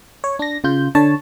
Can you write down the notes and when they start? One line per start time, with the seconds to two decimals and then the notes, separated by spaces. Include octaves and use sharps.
0.24 C#5
0.39 D4 A#6
0.64 C#3 F4 G6
0.95 D3 D4 C#5 A5